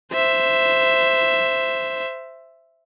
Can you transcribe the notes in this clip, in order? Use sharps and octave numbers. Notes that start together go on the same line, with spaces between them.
C5 E5